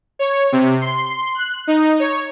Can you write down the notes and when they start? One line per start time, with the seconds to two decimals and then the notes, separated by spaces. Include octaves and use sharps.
0.19 C#5
0.52 C3
0.82 C6
1.35 F#6
1.67 D#4
2.00 C#5